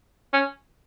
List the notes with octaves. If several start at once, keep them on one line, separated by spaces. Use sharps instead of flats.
C#4